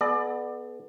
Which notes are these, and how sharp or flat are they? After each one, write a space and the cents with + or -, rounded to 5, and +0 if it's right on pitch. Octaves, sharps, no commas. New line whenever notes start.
B3 +0 G#4 +45 D5 +25